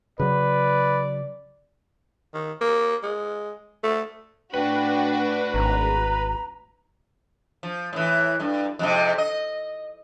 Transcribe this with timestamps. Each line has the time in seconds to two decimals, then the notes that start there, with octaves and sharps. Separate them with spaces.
0.19 C#3 F#3 B4 D5
2.34 D#3
2.61 A#3
3.03 G#3
3.84 A3
4.54 A2 D4 F#4 B4 G5
5.54 G#1 A#5
7.63 F3
7.93 A2 E3
8.40 G2
8.79 F2 G#2 C3
9.18 D#5